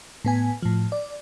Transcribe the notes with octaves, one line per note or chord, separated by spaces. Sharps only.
A2 B3 G#5
A2 F3
D5